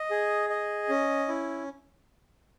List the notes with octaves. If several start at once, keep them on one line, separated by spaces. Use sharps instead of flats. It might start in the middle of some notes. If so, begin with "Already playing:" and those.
Already playing: D#5
G#4
D#5
C#4
E4